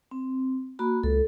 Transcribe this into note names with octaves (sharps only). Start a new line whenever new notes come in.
C4
A#3 F#4 B5
C#2 A4